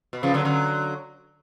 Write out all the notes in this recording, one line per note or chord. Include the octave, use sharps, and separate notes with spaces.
B2
C#3 F3
D3 F#3
D3 F#3